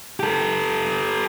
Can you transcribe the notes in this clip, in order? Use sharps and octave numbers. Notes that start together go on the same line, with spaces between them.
G4 A4